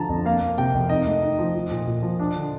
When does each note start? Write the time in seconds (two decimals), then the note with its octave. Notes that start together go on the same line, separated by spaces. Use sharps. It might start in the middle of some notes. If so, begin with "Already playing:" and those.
Already playing: D3 F3 A5 A#5
0.09 F2
0.25 A#3 F5
0.42 A#3
0.58 C3 G5
0.74 F2
0.89 D#4 D#5
1.06 A3
1.22 D#4
1.39 F3
1.54 F3
1.71 A#2
1.87 A#2
2.03 F3
2.19 D4
2.35 D3